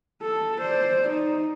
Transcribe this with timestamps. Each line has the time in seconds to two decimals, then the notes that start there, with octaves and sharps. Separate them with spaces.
0.22 A4
0.62 C5 D5
1.10 D#4